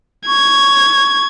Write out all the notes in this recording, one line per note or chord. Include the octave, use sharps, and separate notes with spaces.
C#6 G#6